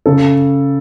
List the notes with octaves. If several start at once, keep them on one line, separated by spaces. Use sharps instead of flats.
C#3 A4